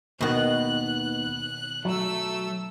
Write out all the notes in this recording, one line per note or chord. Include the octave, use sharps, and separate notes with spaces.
D#2 B2 D#3 B3 F#6
F#3 A3 E6